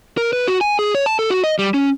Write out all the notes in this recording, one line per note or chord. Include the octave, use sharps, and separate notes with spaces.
A#4
B4
F#4
G#5
G#4
C#5
A5
A4
F#4
D#5
G3
C#4